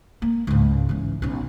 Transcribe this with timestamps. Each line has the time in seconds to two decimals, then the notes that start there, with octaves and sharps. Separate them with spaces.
0.22 A#3
0.47 C#2 G#2
0.89 E3 C#4
1.22 B1 C#4